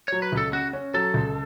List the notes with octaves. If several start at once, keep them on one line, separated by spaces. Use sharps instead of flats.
F#3 C#5
B4
C#2
A4
C#3 F#4
C#4
F#3 A4
C#2